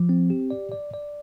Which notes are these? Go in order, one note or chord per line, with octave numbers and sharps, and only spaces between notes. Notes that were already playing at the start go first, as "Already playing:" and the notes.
Already playing: F3
C4
G4
D5
D5
D5